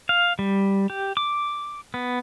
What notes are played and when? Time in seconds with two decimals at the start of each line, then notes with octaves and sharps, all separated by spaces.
0.09 F5
0.39 G3
0.90 G4
1.17 D6
1.94 B3